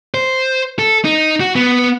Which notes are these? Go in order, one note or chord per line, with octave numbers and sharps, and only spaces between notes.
C5
A4
D#4
F#4
B3